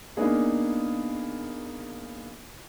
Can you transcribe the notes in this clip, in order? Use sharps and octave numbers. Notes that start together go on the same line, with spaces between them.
A#3 B3 D4 D#4 G#4